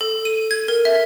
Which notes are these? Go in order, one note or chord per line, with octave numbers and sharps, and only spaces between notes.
A4
D#7
G#6
A#4
E5